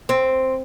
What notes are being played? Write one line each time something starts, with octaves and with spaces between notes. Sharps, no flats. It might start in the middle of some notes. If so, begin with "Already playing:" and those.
C4